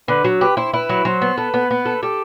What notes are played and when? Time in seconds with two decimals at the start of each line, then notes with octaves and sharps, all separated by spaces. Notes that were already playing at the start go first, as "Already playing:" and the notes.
0.08 D3 B4
0.24 F#3
0.41 G4 B4
0.57 E4 C5
0.74 E4 B4
0.89 F#3
1.05 F#3 C5
1.22 B3
1.37 A4 B4
1.54 B3
1.71 B3
1.86 A4
2.03 G4 A4